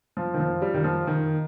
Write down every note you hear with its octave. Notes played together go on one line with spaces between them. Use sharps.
F3
D#3
F3
G3
D#3
F3
D#3